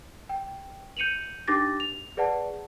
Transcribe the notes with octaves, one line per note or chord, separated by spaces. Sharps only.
G5
G6 C#7 D#7 F7 F#7
D4 D#4 G4 D6 A6 A#6
F7
G#4 B4 D5 F#5 A5